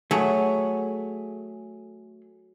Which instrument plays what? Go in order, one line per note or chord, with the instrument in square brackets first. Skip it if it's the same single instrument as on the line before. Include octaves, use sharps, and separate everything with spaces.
[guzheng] F#3 [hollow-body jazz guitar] A3 G#4